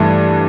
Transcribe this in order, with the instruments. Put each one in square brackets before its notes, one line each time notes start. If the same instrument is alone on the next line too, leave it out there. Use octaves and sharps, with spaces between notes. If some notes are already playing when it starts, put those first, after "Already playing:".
Already playing: [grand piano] G2 E3 A3